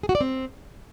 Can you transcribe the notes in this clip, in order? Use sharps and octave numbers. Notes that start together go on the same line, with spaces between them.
G#4
F#4
D5
C4